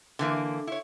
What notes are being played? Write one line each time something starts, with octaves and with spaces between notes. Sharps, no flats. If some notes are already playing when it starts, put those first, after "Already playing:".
D3 E3 A#3
E4 C#5